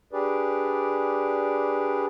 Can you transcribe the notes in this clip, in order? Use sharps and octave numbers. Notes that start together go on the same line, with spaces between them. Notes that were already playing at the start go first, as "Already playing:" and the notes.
D4 G4 G#4 B4 D5